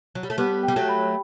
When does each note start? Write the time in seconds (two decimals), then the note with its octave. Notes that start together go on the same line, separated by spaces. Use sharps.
0.15 F#3
0.23 G3
0.30 A3
0.38 G3 B3 G4
0.63 G5
0.68 G3
0.76 F#3 A3
0.89 B5